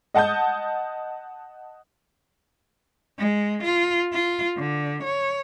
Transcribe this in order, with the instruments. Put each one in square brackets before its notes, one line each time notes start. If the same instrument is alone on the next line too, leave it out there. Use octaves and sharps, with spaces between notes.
[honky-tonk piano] D#5 F#5 A5 D#6 G6
[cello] G#3
F4
F4
D3
C#5